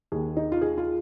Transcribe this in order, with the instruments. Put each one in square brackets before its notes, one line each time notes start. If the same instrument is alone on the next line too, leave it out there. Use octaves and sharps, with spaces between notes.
[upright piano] D#2 D#3 G#4
D#4
F4
G#4
F4